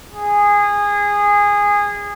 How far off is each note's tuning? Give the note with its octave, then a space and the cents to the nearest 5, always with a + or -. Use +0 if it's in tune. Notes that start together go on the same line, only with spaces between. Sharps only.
G#4 -20